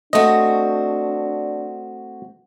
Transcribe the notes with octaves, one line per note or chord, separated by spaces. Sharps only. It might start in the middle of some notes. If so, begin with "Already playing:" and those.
A3 C4 D4 F#4 D#5